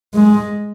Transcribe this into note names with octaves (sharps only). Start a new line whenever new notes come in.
G#3